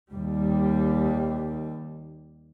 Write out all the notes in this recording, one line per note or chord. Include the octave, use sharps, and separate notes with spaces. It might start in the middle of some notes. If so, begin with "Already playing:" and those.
D#2 G3